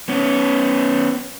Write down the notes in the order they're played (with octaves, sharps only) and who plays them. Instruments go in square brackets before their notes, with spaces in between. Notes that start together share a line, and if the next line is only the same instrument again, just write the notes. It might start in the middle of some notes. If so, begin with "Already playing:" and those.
[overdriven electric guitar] B3 C#4